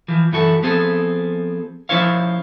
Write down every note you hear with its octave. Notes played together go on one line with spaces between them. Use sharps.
E3 F3
F#2 E3 E4 F#4 A4
F3 B3 C4 G#4 A4
F3 C#4 E4 C5 C#5 F5